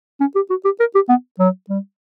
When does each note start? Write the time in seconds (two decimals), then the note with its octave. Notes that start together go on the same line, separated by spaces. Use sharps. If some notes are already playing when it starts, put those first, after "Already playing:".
0.20 C#4
0.35 G4
0.50 F#4
0.65 G4
0.80 A#4
0.95 G4
1.09 B3
1.39 F#3
1.69 G3